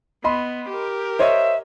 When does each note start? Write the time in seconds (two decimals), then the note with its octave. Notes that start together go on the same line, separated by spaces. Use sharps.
0.24 B3 D#5 B5 C6
0.69 G4 A#4
1.19 C5 C#5 D#5 E5